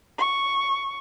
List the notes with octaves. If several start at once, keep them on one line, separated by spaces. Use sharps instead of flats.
C#6